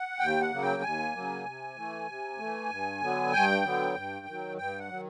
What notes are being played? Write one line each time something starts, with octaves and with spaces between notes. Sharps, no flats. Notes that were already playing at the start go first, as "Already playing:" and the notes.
Already playing: F#5
D#2 G5
F#5
C#3 F#3 A#3
G5
D#2 G#5
C#3 F#3 A#3
C3
E3 A3
C3
E3 A3
G2
D3 F#3 B3
G2 G5
D3 F#3 B3
G2
D#3 F#3
G2 G5
F#5
D#3 F#3